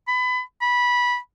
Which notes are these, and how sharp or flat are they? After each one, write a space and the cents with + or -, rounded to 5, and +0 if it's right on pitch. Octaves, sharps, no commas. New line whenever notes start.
B5 +25
B5 -15